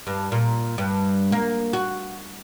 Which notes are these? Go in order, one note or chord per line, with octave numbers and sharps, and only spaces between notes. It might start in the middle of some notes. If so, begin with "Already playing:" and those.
G2
A#2
G2
A#3
F#4